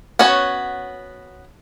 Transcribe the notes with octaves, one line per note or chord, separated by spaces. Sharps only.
B3 C#4 F#4 C#5